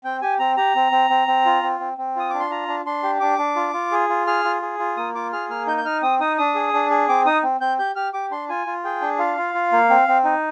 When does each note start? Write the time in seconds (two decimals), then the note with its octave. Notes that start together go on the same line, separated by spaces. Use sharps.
0.04 C4 G5
0.22 G4 G#5
0.39 C4 A#5
0.57 G4 A#5
0.75 C4
0.92 C4
1.10 C4
1.28 C4
1.45 F4
1.63 C4
1.80 C4
1.98 C4
2.16 F4 D#6
2.30 D4 D6
2.40 C6
2.50 F4 A#5
2.68 D4
2.85 D4 C6
3.03 G4
3.20 D4 D6
3.38 D4
3.56 F4
3.73 F4
3.91 G#4
4.09 F4
4.27 G#4 F6
4.44 F4
4.62 G#4
4.79 F4
4.97 A#3 D#6
5.15 F4 D6
5.33 G#4 F6
5.49 A#3 F6
5.67 D#4 G6
5.77 G6
5.84 D#4 F6
6.02 C4 D#6
6.20 D#4 D#6
6.38 D4 D#6
6.55 G#4
6.73 D4
6.90 G#4
7.09 C4 D6
7.25 D#4 D#6
7.43 C4
7.60 C4 G6
7.79 G4 G6
7.96 G4 F6
8.13 G4 D6
8.31 D4 C6
8.49 F4 G#5
8.67 F4
8.84 G#4 G5
9.01 D4
9.19 F4 F5
9.38 F4
9.54 F4
9.72 A#3
9.90 C4
10.08 C4
10.24 D#4